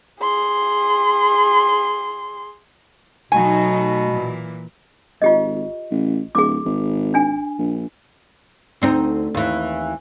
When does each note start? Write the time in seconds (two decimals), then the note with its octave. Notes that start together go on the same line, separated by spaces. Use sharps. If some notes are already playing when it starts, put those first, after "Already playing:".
0.21 G#4 C6
3.32 B2 F#3 A3 D#4 G#5
4.10 A#2 E3
5.22 G#1 F4 G4 D#5
5.91 A1
6.35 D1 G#4 D6
6.65 G#1
7.14 D4 G#5
7.58 A#1
8.82 D2 C4 D#4
9.34 D#2 E3